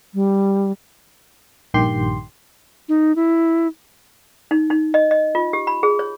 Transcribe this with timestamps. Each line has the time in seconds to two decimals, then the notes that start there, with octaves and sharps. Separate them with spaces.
0.14 G3
1.74 A#1 G2 D#3 G4 C6
2.89 D#4
3.16 E4
4.51 D#4
4.70 D#4
4.94 D#5
5.11 D#5
5.35 F4
5.53 G4
5.67 B5
5.83 G#4
5.99 C#5